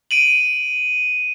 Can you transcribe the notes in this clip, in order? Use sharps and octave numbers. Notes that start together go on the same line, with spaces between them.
D7 D#7 F#7